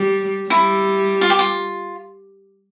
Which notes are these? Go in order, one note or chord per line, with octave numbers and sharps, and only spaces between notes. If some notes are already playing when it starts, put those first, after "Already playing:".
Already playing: G3
G3 E4
F4
G4
F4